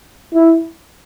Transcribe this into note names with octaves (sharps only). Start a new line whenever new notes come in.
E4